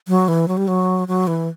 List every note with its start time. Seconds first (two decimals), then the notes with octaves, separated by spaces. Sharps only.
0.08 F#3
0.28 E3
0.48 F#3
0.57 G3
0.68 F#3
1.08 F#3
1.27 E3